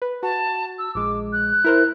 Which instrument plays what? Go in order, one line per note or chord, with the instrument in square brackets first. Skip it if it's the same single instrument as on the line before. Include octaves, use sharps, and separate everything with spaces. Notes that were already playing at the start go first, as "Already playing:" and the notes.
[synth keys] B4
[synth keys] F#4 [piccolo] A5
[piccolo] E6
[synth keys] A#1 G#3 [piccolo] D6
[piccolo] F#6
[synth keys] E4 A#4 C5